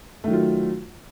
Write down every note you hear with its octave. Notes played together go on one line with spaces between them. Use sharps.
D#3 F#3 A3 F4